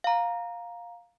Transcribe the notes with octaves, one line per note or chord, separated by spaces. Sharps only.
F5 A#5